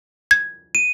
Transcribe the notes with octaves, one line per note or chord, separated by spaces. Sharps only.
G#6
D#7